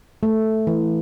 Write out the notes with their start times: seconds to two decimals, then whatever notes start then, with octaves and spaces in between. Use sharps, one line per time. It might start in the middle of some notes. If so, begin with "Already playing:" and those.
0.23 A3
0.67 E3